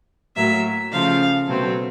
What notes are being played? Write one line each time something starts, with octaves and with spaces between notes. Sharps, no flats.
A2 F#3 A#3 E5
C#3 F3 A3 F5
B2 F#3 A3 C4